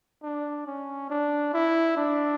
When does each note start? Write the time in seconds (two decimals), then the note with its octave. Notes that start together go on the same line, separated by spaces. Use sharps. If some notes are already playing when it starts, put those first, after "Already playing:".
0.23 D4
0.67 C#4
1.10 D4
1.54 E4
1.97 D4